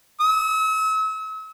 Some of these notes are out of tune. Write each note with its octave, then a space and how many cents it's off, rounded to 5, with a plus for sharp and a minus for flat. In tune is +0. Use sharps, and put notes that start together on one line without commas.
E6 -40